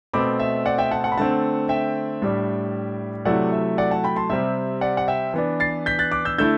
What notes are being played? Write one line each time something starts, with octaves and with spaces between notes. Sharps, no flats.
B2 A3 C4 B5 D6
E5
D5 F#5
E5 G5
F#5 A5
F#5 A5
B5
D3 A3 C4 F#5 A5
E5 G5
A2 G3 D4
C3 F#3 A3 E4 D5 F#5
E5
D5 F#5
F#5 A5
G5 B5
A5 C6
C3 G3 C4 E5
D5 F#5
F#5
E5 G5
E3 B3 D4
A6 C7
G6 B6
F#6 A6
D6 F#6
E6 G6
D3 A3 E4 E6 G6